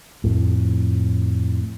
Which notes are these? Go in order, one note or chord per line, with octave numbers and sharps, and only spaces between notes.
F2 A2